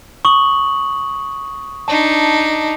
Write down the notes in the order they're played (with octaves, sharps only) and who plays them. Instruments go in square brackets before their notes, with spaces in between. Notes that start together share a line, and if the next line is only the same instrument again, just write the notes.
[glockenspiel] C#6 D#6 F#7
[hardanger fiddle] D4 D#4 [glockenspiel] A5